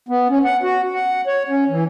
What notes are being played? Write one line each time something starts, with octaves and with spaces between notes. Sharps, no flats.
B3
C#4
F#5
F#4
F#5
C#5
C#4
E3